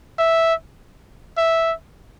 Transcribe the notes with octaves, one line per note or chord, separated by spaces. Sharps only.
E5
E5